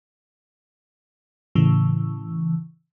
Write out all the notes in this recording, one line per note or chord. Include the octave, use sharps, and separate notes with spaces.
A2 C#3 E3